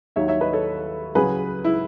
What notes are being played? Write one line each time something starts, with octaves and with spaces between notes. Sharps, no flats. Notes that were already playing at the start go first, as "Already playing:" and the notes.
D#2 D#3 F#3 C#5 E5
C#5 E5
B4 D#5
A4 C#5
C#2 C#3 F#3 G#4 B4
E4